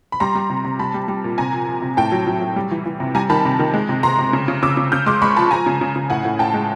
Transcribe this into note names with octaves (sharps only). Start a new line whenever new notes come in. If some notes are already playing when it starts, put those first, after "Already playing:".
B5
G3 A#5 C6
G3
C3
C3
G3 A5 B5
G3
G3
A#2
C3 G#5 A#5
F3
F3
C3
A2 G5 A5
F#3
F#3
F#3
G3
E3
E3
C3
G3 G#5 A#5
D#3 A5 B5
C3
D#3
G#3
C3
C3 A#5 C6
C3
C#3
C#3
C#3 D6 E6
C#3
C#3 F6 G6
G#3 C6 D6
G#3 B5 C#6
F3 A5 B5
F3 G#5 A#5
C#3
C#3
C#3
A2 F#5 G#5
A2
A2 G5 A5
G#3